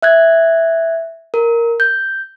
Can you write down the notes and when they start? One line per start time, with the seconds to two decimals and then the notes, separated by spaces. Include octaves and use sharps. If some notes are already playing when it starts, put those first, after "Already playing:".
0.02 E5 F#6 G#6
1.34 A#4
1.80 G6